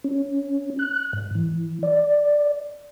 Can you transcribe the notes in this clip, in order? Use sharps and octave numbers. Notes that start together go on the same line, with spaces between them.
C#4
F#6
G#2
E3
D5